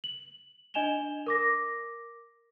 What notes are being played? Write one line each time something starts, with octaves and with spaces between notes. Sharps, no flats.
F#7
D4 D#5 G#5 E7 F7 G7
A#4 D6 A#6